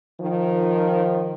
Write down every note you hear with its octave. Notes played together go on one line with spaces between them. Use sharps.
D#3 F3